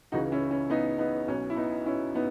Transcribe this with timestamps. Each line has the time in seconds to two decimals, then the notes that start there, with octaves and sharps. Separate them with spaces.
0.12 C#2 C#3 E3 D#4 F#4
0.32 C#4 E4
0.51 C#4
0.70 B3 D#4
0.99 B3 D#4
1.28 B1 B2 C#4
1.50 E4
1.56 B3 D#4
1.86 C#4 E4
2.15 B3 D#4